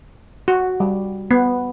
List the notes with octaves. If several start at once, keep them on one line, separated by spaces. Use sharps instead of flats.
F#4
G3
B3